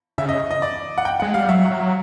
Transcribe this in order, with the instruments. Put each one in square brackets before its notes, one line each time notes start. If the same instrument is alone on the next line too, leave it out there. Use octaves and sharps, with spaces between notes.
[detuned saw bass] C#3 [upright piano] E5
[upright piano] D#5
D#5
D5
F#5
G5
[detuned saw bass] G#3 [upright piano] F#5
[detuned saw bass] G3 [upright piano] F5
[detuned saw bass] F#3 [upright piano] E5
[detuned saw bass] F#3